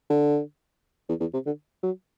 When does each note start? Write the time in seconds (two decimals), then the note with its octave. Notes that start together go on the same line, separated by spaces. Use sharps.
0.10 D3
1.09 E2
1.20 E2
1.33 C3
1.46 D3
1.83 F#3